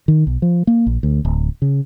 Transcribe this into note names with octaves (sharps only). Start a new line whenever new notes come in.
D#3
B1
F3
A#3
A#1
D2
D1
C#3